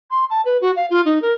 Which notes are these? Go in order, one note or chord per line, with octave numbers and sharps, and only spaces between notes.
C6
A5
B4
F#4
F5
F4
D#4
A#4